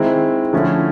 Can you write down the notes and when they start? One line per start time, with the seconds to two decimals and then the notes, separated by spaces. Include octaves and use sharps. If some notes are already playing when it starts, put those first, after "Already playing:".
Already playing: D#3 G#3 C4 E4
0.53 D3 F3 A3 C#4 E4